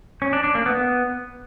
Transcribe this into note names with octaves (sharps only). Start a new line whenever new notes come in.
C#4
D4
D4
A#3
B3